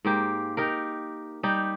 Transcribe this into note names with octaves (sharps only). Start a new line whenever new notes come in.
G#2 A#3 G4
D#4 G4 A#4
G3 D#4 G4